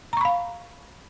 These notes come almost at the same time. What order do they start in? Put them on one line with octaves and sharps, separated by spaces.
A#5 C#6 B5 F5